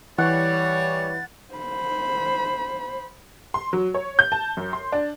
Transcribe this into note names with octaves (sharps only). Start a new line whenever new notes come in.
E3 G3 C#5 F#5 A6
C5 B5
C6
F#3
C#5
G6
A5
F#2
C6
D4